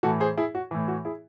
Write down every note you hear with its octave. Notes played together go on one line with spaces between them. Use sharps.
A2 E3 F#4 A4
G#4 C5
E4 G#4
F#4
A2 E3
F#4
E4 G#4